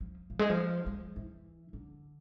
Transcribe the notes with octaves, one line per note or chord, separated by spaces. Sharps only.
F3
F3
G#3
F3
G#3
E3
D3